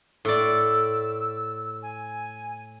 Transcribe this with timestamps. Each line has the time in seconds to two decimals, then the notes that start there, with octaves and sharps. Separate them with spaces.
0.25 A2 D5 E6
1.82 G#5